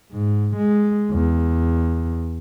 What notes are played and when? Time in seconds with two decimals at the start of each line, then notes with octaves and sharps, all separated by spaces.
0.12 G#2
0.57 G#3
1.11 E2